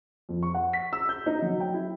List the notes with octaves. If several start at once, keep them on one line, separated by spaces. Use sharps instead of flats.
F2
C#6
F#5
B6
E6
G6
D#4
F#3
G5
E4